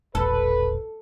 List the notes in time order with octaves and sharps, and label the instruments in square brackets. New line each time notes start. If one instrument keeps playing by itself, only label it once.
[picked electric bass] E1 A#1 [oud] A4 [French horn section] B4